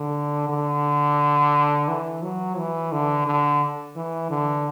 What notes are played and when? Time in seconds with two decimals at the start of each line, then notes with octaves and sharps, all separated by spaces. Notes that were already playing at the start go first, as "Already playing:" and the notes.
Already playing: D3
0.49 D3
1.88 E3
2.22 F#3
2.58 E3
2.92 D3
3.27 D3
3.96 E3
4.30 D3